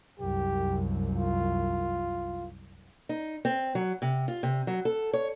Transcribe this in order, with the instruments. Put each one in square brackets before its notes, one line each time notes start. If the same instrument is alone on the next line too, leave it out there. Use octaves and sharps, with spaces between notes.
[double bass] C2 F#2 [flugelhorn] G4
[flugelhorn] F4
[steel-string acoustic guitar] D#4
C4
F#3
C3
F4
C3
F#3
A4
C#5